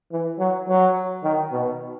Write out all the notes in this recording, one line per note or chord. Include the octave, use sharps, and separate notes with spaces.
E3
F#3
F#3
D#3
B2